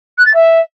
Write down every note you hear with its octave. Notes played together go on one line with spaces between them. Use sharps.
F#6
A6
E5